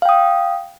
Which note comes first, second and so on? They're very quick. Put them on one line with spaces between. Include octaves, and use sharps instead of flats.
F5 G5 D#6